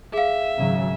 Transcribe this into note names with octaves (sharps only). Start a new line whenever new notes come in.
G#4 E5 F5
G#1 C#3 F#3